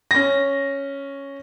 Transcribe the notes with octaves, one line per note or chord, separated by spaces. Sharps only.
C#4 A#6